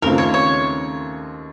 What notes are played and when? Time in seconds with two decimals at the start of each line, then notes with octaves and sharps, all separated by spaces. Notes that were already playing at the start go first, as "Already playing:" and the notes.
0.02 D#2 C#3 A3 C4 F4 A#4
0.18 C#5
0.34 C#5